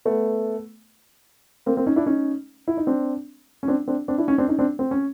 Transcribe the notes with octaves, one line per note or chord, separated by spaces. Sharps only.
A3 B3
A#3 C4
A#3 C4
C#4 D#4
D4 E4
C#4 D#4
E4
D#4
C4 D4
C#4
C4 D4
C4 D4
C4 D4
D4 E4
C#4 D#4
C4 D4
C#4 D#4
C4 D4
C4
C#4